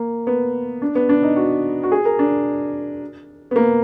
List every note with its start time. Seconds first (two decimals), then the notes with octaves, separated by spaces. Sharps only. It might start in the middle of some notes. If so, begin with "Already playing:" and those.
Already playing: A#3
0.27 B3
0.82 D4
0.95 B3
1.09 D4
1.23 D#4
1.36 F#4
1.83 F#4
1.92 G#4
2.05 A#4
2.19 D4
3.51 B3
3.56 A#3